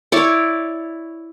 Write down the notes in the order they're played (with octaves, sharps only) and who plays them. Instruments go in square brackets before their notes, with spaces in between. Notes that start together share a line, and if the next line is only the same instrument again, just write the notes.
[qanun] E4 C#5 D5